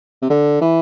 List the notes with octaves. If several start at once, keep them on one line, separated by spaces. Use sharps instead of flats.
C3
D3
E3